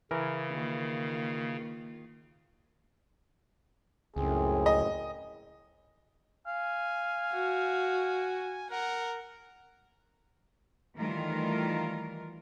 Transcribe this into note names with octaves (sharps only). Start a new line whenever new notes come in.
C#3 E3 A#4
D#3 A#3 F4
C#2 F#2 A2 C4 G#4
D#5
F5 G#5
F#4
A#4 F#5
D#3 E3 G3 A3 F4 A#4